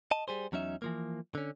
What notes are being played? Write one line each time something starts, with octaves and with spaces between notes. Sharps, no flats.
D#5 A5
G3 G#4 C5
E2 F#3 C#4 D#4 E5
E3 F3 A#3
D3 C#4